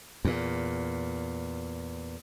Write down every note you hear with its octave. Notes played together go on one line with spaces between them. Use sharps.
E2 A#2